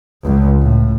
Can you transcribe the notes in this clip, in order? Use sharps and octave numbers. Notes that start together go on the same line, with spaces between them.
C#2
A2